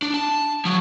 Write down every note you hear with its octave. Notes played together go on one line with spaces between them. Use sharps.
D4
A5
F3 F#3